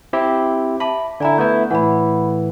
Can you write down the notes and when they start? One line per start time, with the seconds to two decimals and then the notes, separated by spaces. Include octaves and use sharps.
0.13 C4 E4 G4
0.80 E5 A5 B5 D6
1.20 D3 E4 D5 G#5 A#5
1.38 A3 B3 E4 G6
1.71 A2 E3 F#5 B5